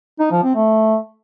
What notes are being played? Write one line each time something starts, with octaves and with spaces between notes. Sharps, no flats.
D#4
F3
C4
A3